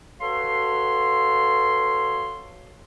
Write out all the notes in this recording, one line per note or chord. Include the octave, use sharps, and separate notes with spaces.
F#4 A4 B4 C#5 F5 C6